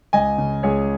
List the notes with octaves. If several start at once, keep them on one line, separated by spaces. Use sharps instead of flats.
C#2 D#5 G#5
C#3
C#2 G#4 C#5